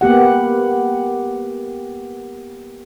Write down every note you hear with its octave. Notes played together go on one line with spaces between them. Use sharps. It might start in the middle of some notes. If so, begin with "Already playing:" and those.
A#3 B3 G4 F#5